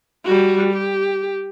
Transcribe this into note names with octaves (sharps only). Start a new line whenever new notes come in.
G3 F#4
G4